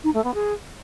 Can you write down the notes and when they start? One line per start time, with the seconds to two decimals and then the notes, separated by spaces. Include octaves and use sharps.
0.04 D#4
0.14 A3
0.24 B3
0.34 G#4